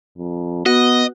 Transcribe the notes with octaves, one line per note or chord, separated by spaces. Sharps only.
F2
B3 F#4 D#5